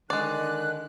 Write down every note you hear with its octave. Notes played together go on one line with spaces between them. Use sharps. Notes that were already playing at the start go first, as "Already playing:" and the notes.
D3 D#3 G#3 D5 F#6